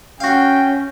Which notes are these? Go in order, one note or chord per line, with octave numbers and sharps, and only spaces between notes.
C#4 F#4 F5 G5